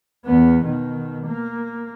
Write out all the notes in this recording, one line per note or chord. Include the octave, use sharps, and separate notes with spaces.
E2 B3
B2 D#3
A#3